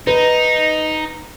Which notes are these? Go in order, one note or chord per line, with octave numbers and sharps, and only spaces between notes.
D#4 B4